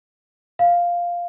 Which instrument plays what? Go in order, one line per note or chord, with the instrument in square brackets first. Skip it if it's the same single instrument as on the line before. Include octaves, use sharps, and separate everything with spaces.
[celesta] F5